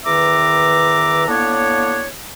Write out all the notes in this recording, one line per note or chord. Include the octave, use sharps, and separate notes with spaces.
E2 D#3 B4 E5 A#5 D6
A2 A#3 B3 D4 C#5